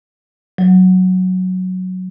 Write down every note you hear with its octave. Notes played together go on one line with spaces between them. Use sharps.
F#3